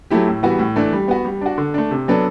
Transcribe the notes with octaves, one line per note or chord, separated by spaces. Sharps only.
F#3 A3 E4 G4
A2
E3 G3 B3 F#4
A2
E3 A3 D4
G3
B3 F#4
G3
D4 F#4
D3
A3 D4
C3
F#3 B3 D4 A4